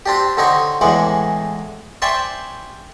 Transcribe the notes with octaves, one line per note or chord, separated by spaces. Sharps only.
C4 D4 G4
D3 C4 D#4 C#5
E2 A2 E3 G#3 F#5 D6
C5 D5 E5 G5 G#5 C#6